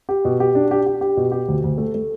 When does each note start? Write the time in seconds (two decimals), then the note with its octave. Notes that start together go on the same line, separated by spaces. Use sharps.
0.09 G4
0.25 B2
0.40 G4
0.55 D4
0.71 G4
0.86 G4
1.01 G4
1.17 B2
1.32 G4
1.48 D2
1.63 D2
1.78 A3
1.94 A3